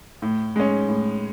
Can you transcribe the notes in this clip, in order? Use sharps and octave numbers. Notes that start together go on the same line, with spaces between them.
A2
G#3 C#4
A2